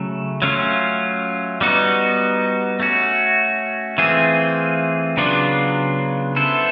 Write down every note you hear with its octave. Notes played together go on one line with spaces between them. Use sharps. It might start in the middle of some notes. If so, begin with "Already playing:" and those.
Already playing: C#3 F#3 A3
F#3 A3 C#4 F4
G3 B3 D#4 F#4
A3 C#4 F#4
E3 A3 C4 F4 G#4
C#3 F#3 B3 D4 F4
B3 E4 A4 C5